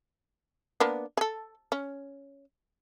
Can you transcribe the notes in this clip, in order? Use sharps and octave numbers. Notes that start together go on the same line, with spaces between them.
A#3 B3 D4
G#4 A4
C#4